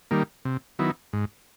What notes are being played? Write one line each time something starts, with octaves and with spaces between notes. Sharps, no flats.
D#3 G3 A#3
C3
D#3 F#3 B3 E4
G#2